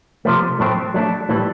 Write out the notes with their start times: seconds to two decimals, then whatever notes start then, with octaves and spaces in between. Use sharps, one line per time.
0.25 C3 F3 A3
0.59 A2 F#3 A3 C4
0.94 F#3 A3 D4
1.29 A2 E3 G3